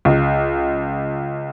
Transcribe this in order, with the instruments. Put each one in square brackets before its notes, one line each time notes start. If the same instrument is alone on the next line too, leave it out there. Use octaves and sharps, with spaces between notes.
[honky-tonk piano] C#2